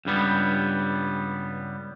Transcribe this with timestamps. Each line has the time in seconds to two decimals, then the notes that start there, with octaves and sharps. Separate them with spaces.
0.05 C#2 G2 G3 B3